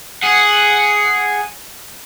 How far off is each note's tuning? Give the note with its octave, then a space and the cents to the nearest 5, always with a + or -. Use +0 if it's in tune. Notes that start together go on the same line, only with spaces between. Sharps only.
G#4 +0 F#5 +0